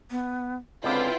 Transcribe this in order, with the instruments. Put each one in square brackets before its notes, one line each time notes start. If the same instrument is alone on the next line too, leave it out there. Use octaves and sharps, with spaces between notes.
[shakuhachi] B3
[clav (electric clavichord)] C#2 D3 [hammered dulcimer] B2 F#3 [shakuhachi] C4 [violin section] E4 F4 G5